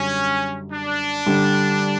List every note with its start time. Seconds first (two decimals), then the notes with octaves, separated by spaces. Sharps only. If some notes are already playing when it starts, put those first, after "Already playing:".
Already playing: F#2 D3 G3 C#4
0.72 D4
1.26 D3 G3